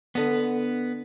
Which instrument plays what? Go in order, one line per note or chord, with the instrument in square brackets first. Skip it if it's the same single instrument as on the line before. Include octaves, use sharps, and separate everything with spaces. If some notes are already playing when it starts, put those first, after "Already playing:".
[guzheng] D3 D#5 [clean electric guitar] B3